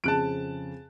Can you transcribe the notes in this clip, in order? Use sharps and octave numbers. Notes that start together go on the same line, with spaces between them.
F2 C#3 C4 A5 F#6 D7